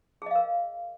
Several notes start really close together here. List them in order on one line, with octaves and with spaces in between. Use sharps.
G#4 D#5 F5 A#4